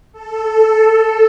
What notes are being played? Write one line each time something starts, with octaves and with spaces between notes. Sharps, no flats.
A4
A4